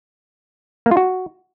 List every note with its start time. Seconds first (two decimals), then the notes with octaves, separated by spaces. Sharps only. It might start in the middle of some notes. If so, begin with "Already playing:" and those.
0.86 A#3
0.91 F4
0.97 F#4